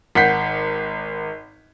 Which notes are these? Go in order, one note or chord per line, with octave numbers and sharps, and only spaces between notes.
G#1 F#5 G6 B6 C7